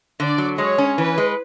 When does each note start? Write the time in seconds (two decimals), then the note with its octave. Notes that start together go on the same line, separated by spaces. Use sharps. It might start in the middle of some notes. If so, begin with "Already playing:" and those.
0.19 D3 D5
0.38 F#3
0.58 G#3 C#5
0.78 C#4
0.98 E3 B4
1.18 G#3